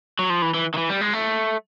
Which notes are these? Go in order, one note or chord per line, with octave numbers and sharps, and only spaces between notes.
F#3
F3
E3
E3
D#3
E3
G3
G#3
A3